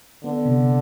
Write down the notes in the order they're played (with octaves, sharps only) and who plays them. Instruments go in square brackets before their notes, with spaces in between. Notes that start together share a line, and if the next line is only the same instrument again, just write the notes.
[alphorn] D3 [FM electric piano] B3
[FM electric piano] C3